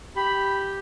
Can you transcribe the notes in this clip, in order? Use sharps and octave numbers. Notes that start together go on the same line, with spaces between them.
G4 B5